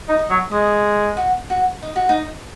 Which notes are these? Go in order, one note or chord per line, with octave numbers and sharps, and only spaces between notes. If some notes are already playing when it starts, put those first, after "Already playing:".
D#4
D#5
F#3
G#3 D#5
F#4
F#4
D#4
F#4
D#4